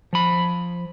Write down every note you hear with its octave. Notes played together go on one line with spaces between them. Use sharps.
F3 B5